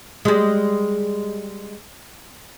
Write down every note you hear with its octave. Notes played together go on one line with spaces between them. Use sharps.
G3 G#3